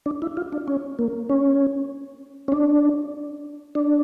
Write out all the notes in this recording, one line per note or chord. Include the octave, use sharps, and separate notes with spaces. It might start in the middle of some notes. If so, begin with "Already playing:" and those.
D4
E4
F4
D4
C#4
A#3
C#4
C#4
D4
D4